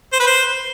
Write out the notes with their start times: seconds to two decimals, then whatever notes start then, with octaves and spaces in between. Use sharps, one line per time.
0.13 C5
0.20 B4
0.27 C5